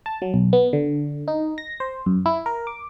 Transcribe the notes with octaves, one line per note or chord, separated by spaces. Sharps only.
A5
F#3
B1
B3
D3
D#4
A#6
C5
F#2
E4
A#4
D6